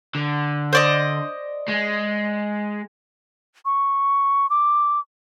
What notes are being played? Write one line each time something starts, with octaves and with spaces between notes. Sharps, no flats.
D3
C5 D5 D#5
G#3
C#6
D6